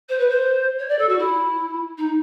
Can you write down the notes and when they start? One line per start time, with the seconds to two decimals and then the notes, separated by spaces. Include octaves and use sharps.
0.08 C5
0.18 B4
0.29 C5
0.78 C#5
0.88 D5
0.98 A4
1.08 F#4
1.18 E4
1.97 D#4